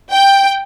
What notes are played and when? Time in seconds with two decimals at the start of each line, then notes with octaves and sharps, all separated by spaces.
0.11 G5